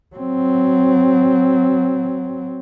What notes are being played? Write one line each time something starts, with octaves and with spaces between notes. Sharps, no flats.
F#3 C4